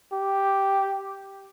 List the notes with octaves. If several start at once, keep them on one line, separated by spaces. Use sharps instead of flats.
G4